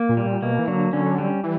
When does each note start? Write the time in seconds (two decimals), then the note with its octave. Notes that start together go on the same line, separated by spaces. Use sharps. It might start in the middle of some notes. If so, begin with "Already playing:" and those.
Already playing: A#3
0.09 A#2
0.17 G3
0.25 A#2
0.42 B2 A#3
0.59 E3
0.68 D3 F#3
0.93 D3 C#4
1.18 G3
1.43 E3